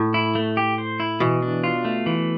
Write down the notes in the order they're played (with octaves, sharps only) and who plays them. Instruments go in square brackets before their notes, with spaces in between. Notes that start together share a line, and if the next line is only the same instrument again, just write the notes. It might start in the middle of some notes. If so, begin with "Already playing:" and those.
Already playing: [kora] A2
[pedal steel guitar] E4
A3
G4
C5
E4
[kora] B2 [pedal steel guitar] E3
[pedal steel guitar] D4
F4
A3
E3